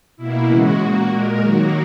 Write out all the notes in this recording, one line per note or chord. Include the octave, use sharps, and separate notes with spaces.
B2 A#3 E4
C#3 E3 G#3 F#4
A#2 A#3 F#4
A#2 G#3 A#4
D#3 F#3 A#3 F#4